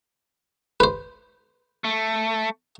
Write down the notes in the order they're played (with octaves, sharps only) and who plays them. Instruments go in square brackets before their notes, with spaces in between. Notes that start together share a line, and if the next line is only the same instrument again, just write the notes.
[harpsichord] B4 C5
[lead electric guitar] A3